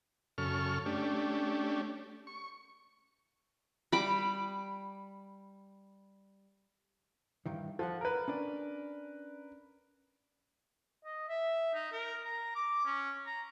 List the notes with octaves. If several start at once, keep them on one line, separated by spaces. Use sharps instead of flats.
F#2 C#3 A4 C#6 F6
A3 C#4 D4 G4
C#6
G3 B5 D6
G2 D#3 E3
F3 A4 F5 F#5
A#4 B4
C#4 D4 D5
D#5
E5
D#4
A#4
A#5
D6
C#4
A#5